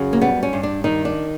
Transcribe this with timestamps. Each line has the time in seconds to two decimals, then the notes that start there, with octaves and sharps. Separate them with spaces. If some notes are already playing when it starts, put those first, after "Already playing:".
Already playing: F#2 C#3
0.13 A#3
0.21 G3 B3
0.43 C#4
0.53 G2
0.63 D4
0.84 D#3 D#4
1.05 D4